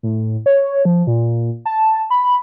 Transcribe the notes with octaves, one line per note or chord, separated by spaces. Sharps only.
A2
C#5
F3
A#2
A5
B5